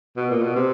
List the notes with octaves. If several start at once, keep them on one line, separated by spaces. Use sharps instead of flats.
B2
A#2
B2
C3